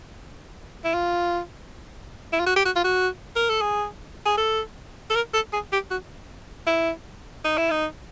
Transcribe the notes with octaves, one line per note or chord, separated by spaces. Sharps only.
E4
F4
E4
F4
F#4
G4
F#4
F4
F#4
A#4
A4
G#4
G#4
A4
A4
A#4
A4
G#4
G4
F#4
E4
D#4
E4
D#4